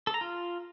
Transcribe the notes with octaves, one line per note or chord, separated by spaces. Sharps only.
A4
A#5
F4